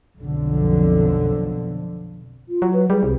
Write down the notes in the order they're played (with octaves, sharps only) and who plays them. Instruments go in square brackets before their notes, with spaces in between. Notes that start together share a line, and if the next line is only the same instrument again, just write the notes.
[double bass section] B1 F2 D3
[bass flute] F4
[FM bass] F#3
[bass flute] B4
[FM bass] G3 [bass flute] G#4
[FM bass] C2